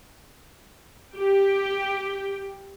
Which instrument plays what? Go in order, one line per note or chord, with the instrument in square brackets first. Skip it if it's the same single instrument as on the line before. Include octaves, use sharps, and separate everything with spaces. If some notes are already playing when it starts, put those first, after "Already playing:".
[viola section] G4 G5